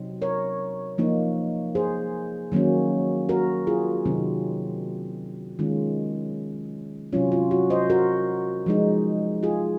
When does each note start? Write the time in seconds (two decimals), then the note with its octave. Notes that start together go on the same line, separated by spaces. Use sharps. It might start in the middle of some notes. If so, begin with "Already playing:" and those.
Already playing: C3 F#3 C4 D#4
0.22 A#4 C#5
0.98 F3 A#3 D#4
1.75 G#4 C5
2.52 D#3 F#3 A#3 C#4
3.29 F#4 A#4
3.67 F4 G#4
4.05 C3 D#3 F#3 C4 D#4
5.59 D#3 G#3 C#4 F4
7.13 C3 F#3 C#4 F4
7.32 F4
7.51 F#4
7.70 C5 D#5
7.90 F#4 A#4
8.66 F3 G#3 D#4
9.43 F4 G#4